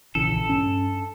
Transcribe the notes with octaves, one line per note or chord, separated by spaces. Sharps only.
A#1 C#3 E3 A4
G2 C#4